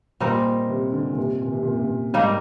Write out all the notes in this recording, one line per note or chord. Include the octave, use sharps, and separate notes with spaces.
A#2 G3 C4 D#4 A#4
C3
D3
A#2
C3
A#2
C3
A#2
C3
A#2
G#2 G3 A#3 D#4